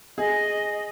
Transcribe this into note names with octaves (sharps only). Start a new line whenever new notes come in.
G#4 D#5